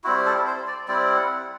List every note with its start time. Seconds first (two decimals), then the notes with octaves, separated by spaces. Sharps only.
0.04 G3 C4 E4 F#4
0.26 A4
0.47 C5
0.67 D5
0.88 G3 C4 E4 D5
1.17 F#5